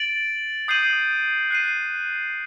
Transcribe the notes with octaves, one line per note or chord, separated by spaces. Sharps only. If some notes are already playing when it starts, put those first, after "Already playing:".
Already playing: A6 D7 F#7
D#6 G6 C7 D#7 F#7
F#6 C7 D#7